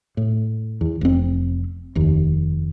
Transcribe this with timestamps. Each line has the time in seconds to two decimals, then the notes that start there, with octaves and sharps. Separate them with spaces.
0.17 A2
0.81 E2
1.01 F1 C4
1.95 F1 D#2